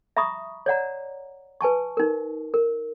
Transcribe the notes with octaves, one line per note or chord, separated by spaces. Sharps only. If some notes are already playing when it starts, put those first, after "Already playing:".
E5 A#5 B5 C#6 D#6
C#5 D5 F#5 A#5
B4 G#5 A5 C#6
D#4 A#4
A#4